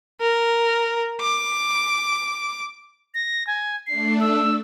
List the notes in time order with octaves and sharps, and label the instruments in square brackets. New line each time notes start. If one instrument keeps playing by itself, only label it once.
[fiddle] A#4
D6
[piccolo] A#6
G#5
[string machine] A3 D4 [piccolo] C7
[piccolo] E6